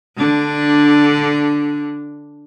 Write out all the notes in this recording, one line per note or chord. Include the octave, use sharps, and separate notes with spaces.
D3 D4